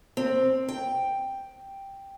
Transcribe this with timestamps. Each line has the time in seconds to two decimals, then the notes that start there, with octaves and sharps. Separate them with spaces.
0.17 C4
0.69 G5